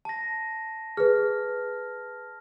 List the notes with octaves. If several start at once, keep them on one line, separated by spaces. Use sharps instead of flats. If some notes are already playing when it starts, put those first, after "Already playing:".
A5 A#6
G#4 B4 F6